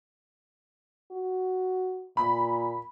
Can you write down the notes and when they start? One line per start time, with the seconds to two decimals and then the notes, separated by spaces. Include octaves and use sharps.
1.12 F#4
2.17 A#2 B5